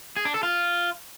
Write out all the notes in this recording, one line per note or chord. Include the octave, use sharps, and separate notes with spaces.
G#4
D4
A4
F4